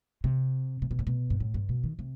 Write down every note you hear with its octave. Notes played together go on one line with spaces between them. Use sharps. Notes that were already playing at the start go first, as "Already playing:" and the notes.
C3
C3
B2
A2
B2
G2
A2
G2
B2
D#3
C3